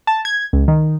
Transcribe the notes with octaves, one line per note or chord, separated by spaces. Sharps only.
A5
G#6
C#2
D#3